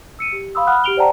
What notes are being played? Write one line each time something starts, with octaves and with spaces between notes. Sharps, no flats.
E6 C#7 D#7
G4
F5 B5 C6 D#6 E6
F#5 B5 D#6 F6 F#6
G4 F6 D7 F7 G7
C5 D5 F#5 G5 A5 A#5